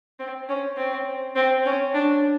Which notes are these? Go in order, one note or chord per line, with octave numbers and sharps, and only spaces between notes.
C4
C#4
C4
C4
C#4
D4